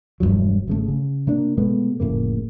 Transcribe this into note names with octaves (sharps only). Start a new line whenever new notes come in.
E1 C2 G2 F#3
G#1 C#3 A3
C#3
C3 A#3 D4
B2 G#3 A3 B3
F1 A2 C#3 A#3